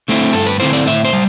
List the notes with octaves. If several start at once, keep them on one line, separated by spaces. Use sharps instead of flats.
D3 A3 C4 E4
G2 A4
B4
D3 A3 C4 E4 C5
D5
A2 E5
C5
G3